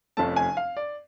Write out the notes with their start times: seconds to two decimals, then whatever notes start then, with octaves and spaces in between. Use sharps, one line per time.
0.17 F1 F2 F3 A3 C#4 A5
0.36 G#5
0.57 F5
0.77 D5